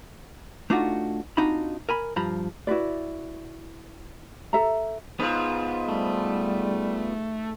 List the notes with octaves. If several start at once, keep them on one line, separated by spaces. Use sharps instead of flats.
A3 D4 D#4 F4 F#4
C4 D4 D#4 F4 F#4 B5
A#4 G#5 B5
G2 F3 A#5 B5
E4 F#4 B4 D5
A4 E5 A#5
G#2 B3 F4
G3 A3